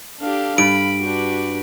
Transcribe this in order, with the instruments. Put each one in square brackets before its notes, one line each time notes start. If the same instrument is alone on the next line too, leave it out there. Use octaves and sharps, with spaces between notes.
[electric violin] D4 G4 [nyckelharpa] A4 F5
[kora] G2 [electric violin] B5 [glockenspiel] D7
[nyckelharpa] D4 G4 [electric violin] F#4 B4